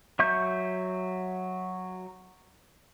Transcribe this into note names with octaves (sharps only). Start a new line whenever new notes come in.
F#3 E5 C#6 G6